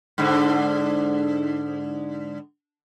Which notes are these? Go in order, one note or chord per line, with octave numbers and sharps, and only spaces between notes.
G#2 D3